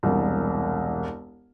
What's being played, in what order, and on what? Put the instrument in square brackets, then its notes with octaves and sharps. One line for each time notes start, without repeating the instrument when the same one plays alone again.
[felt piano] E1 C2